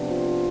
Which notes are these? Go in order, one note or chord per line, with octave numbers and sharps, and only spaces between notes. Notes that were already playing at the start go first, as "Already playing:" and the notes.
Already playing: C3 F3 B3 D4
F4